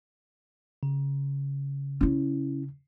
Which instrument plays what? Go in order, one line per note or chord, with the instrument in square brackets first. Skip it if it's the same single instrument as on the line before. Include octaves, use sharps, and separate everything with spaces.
[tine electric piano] C#3
[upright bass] C#4 E4